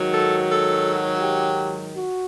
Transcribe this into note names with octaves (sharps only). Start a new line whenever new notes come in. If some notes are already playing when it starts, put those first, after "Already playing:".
Already playing: G#2 D#3 F#3
A4
A4
G4
F#4